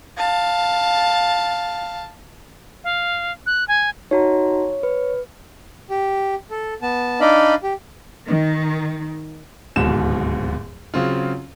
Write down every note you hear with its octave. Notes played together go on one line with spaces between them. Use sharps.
F5 A5
F5
F#6
G#5
D#4 F#4 C#5 A#5
B4
G4
A4
B3 A5
D4 D#4 D5 D#5 F5 B5
G4
D#3
D1 D#2 G#2 B2 E7
C#3 F#3 C4 C#4 F4